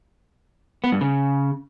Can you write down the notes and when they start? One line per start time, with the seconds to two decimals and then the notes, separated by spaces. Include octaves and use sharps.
0.84 B3
0.92 G2
1.01 C#3